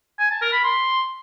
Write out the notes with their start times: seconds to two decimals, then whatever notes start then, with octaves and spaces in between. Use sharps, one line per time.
0.19 G#5
0.30 A5
0.41 A#4
0.52 B5
0.63 C6